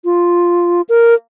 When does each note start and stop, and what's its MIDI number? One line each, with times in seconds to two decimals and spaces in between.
0.05 0.82 65
0.89 1.14 70